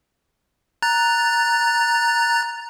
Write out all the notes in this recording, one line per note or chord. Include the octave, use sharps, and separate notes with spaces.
A#5 F#6 A6